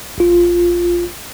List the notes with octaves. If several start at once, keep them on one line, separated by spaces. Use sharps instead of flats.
A1 F4